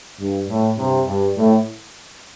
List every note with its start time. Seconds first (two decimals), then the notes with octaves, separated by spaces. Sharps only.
0.20 G2
0.49 A2
0.78 G2 C3
1.08 G2
1.37 A2